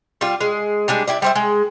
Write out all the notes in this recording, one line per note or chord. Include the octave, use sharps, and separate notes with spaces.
G3 F4
G#3
G3 G#3 D4
E4 G4 D5
G3 C5 E5
G#3